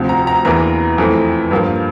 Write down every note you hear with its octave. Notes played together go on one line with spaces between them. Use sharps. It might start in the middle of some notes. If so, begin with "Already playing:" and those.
Already playing: D2 C3 F3
A#5
A#5
E2 E3 A#3 A#5
F2 E3 A3
G2 F3 A#3